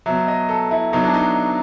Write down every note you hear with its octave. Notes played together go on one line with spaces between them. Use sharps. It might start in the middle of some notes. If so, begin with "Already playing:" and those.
B2 F#3 E5
D#5
A4
E4
B2 F#3 D#4
D4
D#4